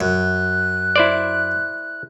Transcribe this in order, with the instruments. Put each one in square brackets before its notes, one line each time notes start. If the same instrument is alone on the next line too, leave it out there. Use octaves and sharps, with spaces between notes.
[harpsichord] F#2 [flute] F#6
[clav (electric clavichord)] E4 C5 D5